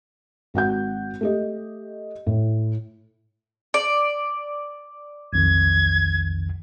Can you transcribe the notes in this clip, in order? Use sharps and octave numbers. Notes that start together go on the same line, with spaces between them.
G#1 F#4 F#5 G6
A3 G4 D#5
A2
D5
B1 F2 D#3 G#6